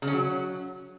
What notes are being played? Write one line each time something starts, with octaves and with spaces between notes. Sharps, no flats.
C#3
C#4
F#3